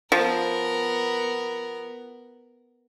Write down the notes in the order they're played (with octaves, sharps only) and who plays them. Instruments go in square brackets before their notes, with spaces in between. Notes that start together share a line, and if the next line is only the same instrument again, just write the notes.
[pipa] F3 [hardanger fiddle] B3 A#4